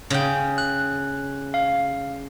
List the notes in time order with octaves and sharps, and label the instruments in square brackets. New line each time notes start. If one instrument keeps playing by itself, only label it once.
[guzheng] C#3 G5
[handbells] F#6
F5